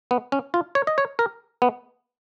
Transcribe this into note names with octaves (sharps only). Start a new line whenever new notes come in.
B3
C#4
F4
C#5
D#5
C#5
A#4
B3